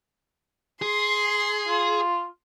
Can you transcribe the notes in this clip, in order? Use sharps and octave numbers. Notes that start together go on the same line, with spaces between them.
G#4 C6
F4